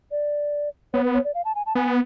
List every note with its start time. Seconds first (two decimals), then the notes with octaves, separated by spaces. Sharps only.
0.11 D5
0.94 B3 C#5
1.04 B4
1.14 C#5
1.24 D5
1.34 F5
1.45 A5
1.55 G#5
1.66 A5
1.75 B3 G#5